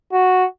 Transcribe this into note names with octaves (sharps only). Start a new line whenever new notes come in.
F#4